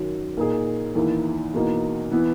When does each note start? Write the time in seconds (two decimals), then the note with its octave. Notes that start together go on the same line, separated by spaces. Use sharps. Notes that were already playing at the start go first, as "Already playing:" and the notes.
Already playing: F#2 D#3 F#3
0.37 A#2 A#3 D#4 G#4
0.95 E2 D#3 A#3 E4
1.54 E2 B2 A#3 D#4
2.11 E3 B3 E4